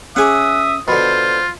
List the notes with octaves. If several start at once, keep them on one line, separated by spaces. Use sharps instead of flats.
C#4 G#4 E5 F#5 G#5 D6 D#6
B2 D3 F4 C5 B5